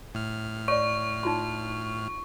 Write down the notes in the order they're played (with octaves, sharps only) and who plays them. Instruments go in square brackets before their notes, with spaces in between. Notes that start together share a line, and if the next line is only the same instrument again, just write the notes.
[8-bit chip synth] A2 F6
[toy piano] C#5 D5 [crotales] C#6
[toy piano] D#4 F4 C6